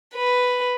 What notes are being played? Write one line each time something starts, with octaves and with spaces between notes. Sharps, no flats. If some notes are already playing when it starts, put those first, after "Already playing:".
B4